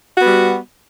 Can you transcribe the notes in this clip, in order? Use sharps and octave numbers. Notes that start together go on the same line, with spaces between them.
G3 B3 F#4